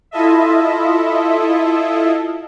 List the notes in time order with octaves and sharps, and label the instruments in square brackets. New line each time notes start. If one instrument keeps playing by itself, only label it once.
[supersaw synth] E4 F4 A4 D#5 E5